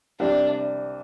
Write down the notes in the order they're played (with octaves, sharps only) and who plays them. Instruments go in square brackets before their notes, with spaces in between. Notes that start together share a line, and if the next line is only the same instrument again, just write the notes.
[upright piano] C2 C3 G3 [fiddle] D4